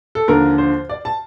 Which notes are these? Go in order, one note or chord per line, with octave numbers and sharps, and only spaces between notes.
A4
D#2 D3 F3 A#4
C5
D5
A5